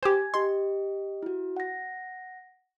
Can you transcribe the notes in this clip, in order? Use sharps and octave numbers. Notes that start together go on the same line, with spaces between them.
G4 C5 G#5 G#6
G4 D#5 C6
E4 F#4
F#5 A#6